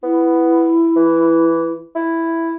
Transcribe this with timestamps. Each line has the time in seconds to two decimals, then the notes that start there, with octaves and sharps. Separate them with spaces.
0.03 B3 E4
0.96 E3
1.95 E4